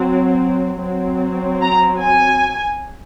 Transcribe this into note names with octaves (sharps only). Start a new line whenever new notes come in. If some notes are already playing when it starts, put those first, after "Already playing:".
Already playing: F#3 C4
F#3 C4
A#5
G#5